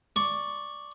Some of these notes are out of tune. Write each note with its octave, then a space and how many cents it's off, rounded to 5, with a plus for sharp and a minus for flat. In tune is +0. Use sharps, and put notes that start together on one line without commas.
D5 +0 C#6 +0